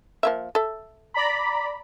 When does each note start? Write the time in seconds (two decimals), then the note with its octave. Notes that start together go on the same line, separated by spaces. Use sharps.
0.23 F3 A#3 E5
0.55 A4 E5
1.14 D5 A#5 B5